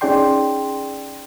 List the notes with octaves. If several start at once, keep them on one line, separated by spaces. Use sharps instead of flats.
C#4 D#4 G#4 D5 G5 C6